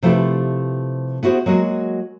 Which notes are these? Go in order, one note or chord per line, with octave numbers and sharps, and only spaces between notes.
C3 F3 A3 E4 G4 B4
B3 E4 F#4 G#4 C5
F#3 G#3 A#3 F#4